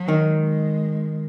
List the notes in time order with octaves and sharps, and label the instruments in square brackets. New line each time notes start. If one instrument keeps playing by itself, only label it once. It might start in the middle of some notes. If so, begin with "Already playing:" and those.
Already playing: [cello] F#3
[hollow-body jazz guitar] D#3
[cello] G#3